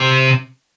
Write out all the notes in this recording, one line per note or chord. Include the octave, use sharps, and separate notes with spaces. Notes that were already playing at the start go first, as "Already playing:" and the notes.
Already playing: C3